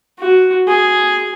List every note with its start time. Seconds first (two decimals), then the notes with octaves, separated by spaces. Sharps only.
0.19 F#4
0.68 G#4